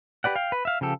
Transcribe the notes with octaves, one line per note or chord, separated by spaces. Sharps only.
G4 B4 D5 F#5
F5 G5
B4
E5 F5
C#3 F3 G4 A4